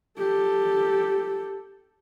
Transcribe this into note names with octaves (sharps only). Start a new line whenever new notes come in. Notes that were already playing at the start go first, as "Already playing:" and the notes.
G4 A4